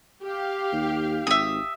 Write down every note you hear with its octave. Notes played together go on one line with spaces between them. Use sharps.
G4 F5
D#2
G#1 E5 D#6